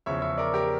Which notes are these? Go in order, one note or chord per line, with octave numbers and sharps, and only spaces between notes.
E2 C#3 F3 C#5 E5
C#5 E5
A#4 D5
G4 A#4